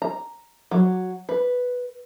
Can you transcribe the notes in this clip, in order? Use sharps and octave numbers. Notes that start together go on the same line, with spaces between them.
A#5
F#3
B4